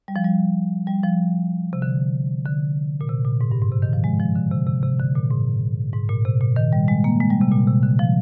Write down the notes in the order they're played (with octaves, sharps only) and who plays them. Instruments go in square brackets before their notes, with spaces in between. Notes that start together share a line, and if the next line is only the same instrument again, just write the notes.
[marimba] G3
F3
G3
G3
F3
C3
D3
D3
A#2
C3
A#2
G#2
G2
G#2
C3
D#3
F3
G#3
F3
D3
C3
C3
C3
D3
A#2
G#2
G#2
A#2
C3
A#2
D#3
G3
G#3
A#3
G#3
G3
C3
A#2
C3
D3
F3